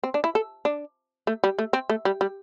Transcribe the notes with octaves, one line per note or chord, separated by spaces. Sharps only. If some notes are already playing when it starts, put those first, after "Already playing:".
C4
D4
E4
A4
D4
A3
G3
A3
C4
A3
G3
G3